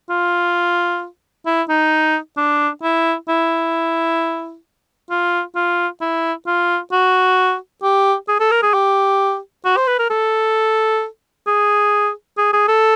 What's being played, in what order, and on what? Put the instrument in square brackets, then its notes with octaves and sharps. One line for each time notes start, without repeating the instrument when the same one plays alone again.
[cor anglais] F4
E4
D#4
D4
E4
E4
F4
F4
E4
F4
F#4
G4
G#4
A4
A#4
G#4
G4
F#4
C5
B4
A#4
A4
G#4
G#4
G#4
A4